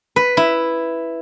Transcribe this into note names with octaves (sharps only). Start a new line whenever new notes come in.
B4
E4